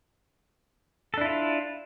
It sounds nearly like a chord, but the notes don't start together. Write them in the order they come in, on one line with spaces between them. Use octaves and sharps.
A4 D4 E4 F4